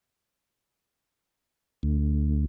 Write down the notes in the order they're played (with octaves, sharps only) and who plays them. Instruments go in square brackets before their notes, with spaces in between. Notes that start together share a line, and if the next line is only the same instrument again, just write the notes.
[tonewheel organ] D2